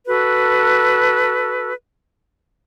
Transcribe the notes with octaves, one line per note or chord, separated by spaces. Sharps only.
F#4 A4 B4